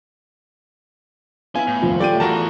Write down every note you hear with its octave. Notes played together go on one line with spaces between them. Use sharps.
B3 E4 F4 F5 G#5
A2
D#1 F2 F4
A3 G4 D5 G5 D#7
E2 E3 F#4 A#4 A5